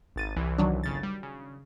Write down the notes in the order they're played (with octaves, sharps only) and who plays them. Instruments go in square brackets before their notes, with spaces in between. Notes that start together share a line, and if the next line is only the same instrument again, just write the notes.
[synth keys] G#1 A6 D#7
C2 E3
[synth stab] D#3 F#3 D4
[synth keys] G1 C#3 A6
G3
C#3